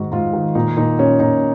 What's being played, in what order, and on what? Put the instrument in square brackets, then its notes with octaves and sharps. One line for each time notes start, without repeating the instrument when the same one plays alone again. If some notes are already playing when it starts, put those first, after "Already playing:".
Already playing: [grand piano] G#2 D#3 F#4
G#2 F4
D#3
A#2 D#4
A#2 D#4
A#2 C#4
A#2 D#4